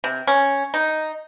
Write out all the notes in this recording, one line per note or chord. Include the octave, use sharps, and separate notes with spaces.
C3
C#4
D#4